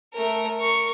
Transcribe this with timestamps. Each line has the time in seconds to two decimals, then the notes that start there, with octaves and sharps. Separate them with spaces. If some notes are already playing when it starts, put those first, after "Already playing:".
0.14 A3 A#4
0.58 A#4 C#6